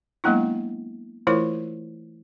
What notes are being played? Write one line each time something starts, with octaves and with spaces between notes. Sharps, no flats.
F#3 G#3 A#3 B3 D4 E4
E3 A3 E4 F4 A#4 C#5